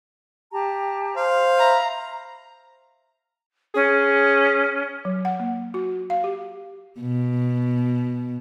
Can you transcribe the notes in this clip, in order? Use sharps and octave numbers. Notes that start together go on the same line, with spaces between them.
G4 A5 A#5
C5 F5
E5 A#5 B5
C#4 G#4
F#3
F#5
A#3
F#4
F5
G4
B2